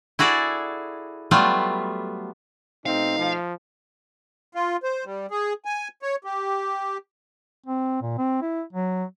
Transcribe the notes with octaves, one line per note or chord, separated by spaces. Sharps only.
E4 F#4 G#4 A4 D5
F#3 G3 A3 B3 F4
B2 A3 C4 D#4 F5
F3
F4
C5
G3
G#4
G#5
C#5
G4
C4
A#2
C4
E4
F#3